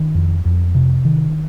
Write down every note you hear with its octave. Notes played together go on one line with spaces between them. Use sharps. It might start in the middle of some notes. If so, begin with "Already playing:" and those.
Already playing: D#3
F2
F2
C3
D#3